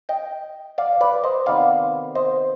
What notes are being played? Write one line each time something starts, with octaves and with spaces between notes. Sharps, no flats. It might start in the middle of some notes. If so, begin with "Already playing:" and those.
D#5 G5
D5 F5
B4 D5
C5 D#5
C3 D#3 B3 D5 F5
C5 D#5